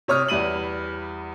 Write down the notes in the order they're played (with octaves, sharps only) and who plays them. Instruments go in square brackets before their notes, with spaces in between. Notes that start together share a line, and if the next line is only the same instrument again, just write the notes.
[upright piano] C3 C#5 D#6 F6
E2 G3 E4 D#7 F#7